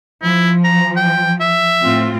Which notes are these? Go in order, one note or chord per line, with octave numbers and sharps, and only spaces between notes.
F3 E4
A#5
G5
E5
A2 C4 F4